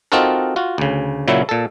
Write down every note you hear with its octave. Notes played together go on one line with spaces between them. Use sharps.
C4 D#4 F4 F#4 A4 A#4
F4 F#4
D2 C#3
A#2 C#3 F#3 E4
A#2 A4